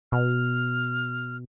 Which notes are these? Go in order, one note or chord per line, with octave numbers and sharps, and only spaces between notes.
B2 F6